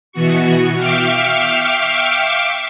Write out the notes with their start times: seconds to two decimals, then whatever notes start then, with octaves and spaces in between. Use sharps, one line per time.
0.12 B2 E3 B3 F#4 C#6
0.76 E5 F5 G5 C#6 D6 F6